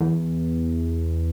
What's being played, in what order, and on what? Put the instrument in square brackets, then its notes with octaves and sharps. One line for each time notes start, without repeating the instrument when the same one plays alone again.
[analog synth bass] E2